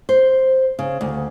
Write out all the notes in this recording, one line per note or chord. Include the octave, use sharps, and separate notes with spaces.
C5
C#3
D2